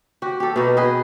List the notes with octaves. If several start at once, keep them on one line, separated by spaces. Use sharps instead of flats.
F#4 G4
G4 A4
B2 D#4 F#4
G#4 B4 D#5